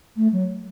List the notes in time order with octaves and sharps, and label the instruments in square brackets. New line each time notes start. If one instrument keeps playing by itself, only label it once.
[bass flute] A3
F#3